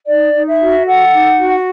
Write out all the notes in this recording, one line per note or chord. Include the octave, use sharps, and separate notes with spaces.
D#4 D5
D#4
E5
F#4
A4 F#5
D#4
F#4